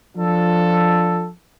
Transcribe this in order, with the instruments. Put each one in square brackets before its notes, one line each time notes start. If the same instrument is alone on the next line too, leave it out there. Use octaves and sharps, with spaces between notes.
[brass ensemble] F3 D4 F4 A4